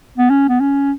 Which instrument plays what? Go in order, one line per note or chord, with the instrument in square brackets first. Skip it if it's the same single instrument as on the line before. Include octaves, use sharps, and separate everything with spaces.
[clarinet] B3
C#4
B3
C#4